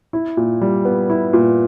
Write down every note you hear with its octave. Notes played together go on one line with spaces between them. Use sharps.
E4
A#2
G3
B3
E4
A#2